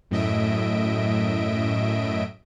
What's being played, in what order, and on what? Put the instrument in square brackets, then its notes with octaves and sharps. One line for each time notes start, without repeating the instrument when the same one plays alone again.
[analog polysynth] F#2 A2 D#5 E5 D7